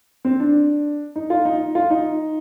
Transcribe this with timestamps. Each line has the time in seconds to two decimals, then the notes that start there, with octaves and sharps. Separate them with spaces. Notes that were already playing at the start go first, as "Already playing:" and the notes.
0.25 C4
0.40 D4
1.16 D#4
1.30 F4
1.45 D#4
1.75 F4
1.90 D#4